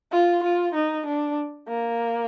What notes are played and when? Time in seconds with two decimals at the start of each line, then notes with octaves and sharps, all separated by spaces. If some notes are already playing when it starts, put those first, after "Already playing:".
0.12 F4
0.43 F4
0.74 D#4
1.06 D4
1.68 A#3